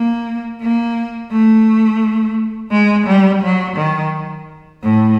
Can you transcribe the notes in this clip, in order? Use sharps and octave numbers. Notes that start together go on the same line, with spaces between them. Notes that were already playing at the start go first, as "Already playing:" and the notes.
Already playing: A#3
A#3
A3
G#3
G3
F#3
D#3
A2